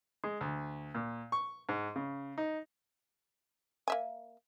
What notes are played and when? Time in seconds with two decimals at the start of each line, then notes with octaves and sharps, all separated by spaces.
0.24 G#3
0.41 D2
0.95 A#2
1.32 C#6
1.69 G#2
1.96 C#3
2.38 D#4
3.88 A#3 E5 G#5